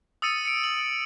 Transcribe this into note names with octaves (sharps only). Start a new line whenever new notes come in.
D#6 E6 A6 C#7 D#7
C#7 D7
F#7